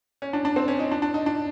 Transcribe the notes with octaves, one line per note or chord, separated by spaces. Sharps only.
C#4
D4
D4
C4
C#4
D#4
D4
D4
D#4
D4